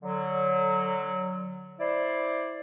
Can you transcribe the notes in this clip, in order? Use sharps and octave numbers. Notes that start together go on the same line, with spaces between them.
D3 F#3
E4 C5 D5